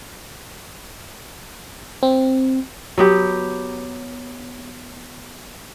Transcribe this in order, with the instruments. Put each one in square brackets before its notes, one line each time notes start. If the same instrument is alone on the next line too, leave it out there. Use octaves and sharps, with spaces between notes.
[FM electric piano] C4
[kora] F#3 B3 G4